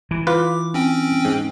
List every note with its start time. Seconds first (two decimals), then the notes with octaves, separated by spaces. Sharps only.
0.11 E3
0.27 F4 B4 D6
0.74 C4 C#4 G5
1.25 G#2